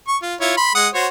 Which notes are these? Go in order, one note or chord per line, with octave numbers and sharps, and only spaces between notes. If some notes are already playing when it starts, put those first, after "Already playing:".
C#6
F4
E4 F4 C#5
B5 C6
G#3 F#5 D#6
F#4 C5 C#5